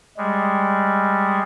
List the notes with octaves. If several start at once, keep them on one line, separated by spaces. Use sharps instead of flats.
G3 G#3